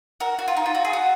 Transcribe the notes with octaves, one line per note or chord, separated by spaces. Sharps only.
F#4 A#4
F#4
F4
D#4
F4
F#4
G#4
F#4